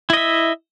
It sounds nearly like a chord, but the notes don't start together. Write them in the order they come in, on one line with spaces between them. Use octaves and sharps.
E4 D#5 E5